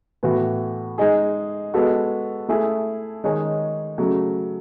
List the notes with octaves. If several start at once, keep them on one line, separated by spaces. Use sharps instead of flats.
A2 E3 B3 F#4
G#3 D#4 G#4
G#3 B3 F#4 A4
A3 E4 G#4
D#3 G#3 D#4 G#4 C#5
C#3 F#3 A3